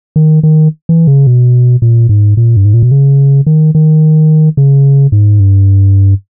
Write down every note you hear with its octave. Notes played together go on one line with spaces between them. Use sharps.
D#3
D#3
E3
C#3
B2
A#2
G#2
A#2
G2
G#2
A#2
B2
C#3
D#3
D#3
C#3
G#2
G2